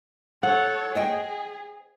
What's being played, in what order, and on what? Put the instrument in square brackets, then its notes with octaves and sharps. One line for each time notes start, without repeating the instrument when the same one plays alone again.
[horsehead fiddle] A4 C#5 [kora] F#5
[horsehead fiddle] G#4 [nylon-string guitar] C5 D#5 G5